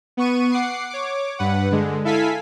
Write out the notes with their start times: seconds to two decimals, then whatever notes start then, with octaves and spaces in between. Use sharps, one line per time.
0.17 B3 C#6 D#7
0.52 F#5 D6 C7
0.90 C#5 D6
1.39 G2 B4 F#5
1.71 D3 G#3
2.05 E4 A4 F5 G#5 B6